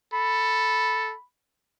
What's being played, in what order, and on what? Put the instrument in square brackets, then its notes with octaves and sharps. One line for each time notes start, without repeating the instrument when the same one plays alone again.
[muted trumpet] A4 [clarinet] B5